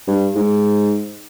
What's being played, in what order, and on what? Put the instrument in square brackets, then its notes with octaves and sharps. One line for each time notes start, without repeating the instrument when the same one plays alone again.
[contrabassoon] G2
G#2